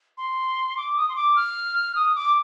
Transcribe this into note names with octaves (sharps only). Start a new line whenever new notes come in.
C6
D6
D#6
C6
D6
F6
D#6
D6